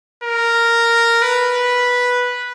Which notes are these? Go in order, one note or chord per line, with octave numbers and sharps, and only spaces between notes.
A#4
B4